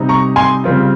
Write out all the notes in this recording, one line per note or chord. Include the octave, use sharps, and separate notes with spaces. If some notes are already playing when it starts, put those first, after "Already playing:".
Already playing: C3 G3 C4 D#4
A#5 C#6
G#5 C6
C#3 G3 C4 F4